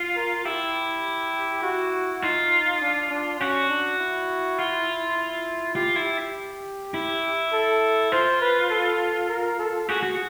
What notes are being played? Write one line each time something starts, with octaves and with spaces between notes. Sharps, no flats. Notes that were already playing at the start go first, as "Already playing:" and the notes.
Already playing: F4
A#4
E4 G4
F#4
D#4 F4
D4
D4
C#4 F#4
D4
E4
F4
E4
F4 G4
E4
G4
E4
A4
F4 C5
B4
A4
A#4
A4
F#4 G#4
F#4